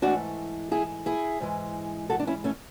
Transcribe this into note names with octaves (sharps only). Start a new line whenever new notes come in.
G#2 E3 A3 D4 F#4
E4 G#4
E4 G#4
G#2 E3 G#3
F#4 A4
D4
C#4 E4
A3 C#4